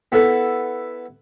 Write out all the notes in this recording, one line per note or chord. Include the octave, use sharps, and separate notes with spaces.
B3 E4 A4 B4